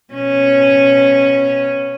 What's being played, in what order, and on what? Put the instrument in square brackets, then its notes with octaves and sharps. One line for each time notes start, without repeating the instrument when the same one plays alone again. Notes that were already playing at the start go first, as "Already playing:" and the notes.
[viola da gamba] B2 C#4